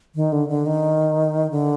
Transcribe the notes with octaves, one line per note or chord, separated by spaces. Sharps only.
D#3
D3
D3
D#3
D3